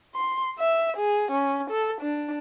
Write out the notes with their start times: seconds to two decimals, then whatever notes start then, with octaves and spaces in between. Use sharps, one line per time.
0.15 C6
0.59 E5
0.97 G#4
1.31 C#4
1.70 A4
2.01 D4